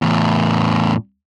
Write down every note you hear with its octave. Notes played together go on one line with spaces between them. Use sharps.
E2 A2